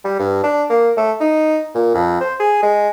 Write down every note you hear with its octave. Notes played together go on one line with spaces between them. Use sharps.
G3
G2
D4
A#3
A3
D#4
A#2
F2
C5
G#4
G#3